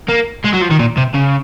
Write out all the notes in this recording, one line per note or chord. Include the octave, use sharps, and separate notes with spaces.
A#3
G#3
F#3
F3
D#3
A#2
C3
C#3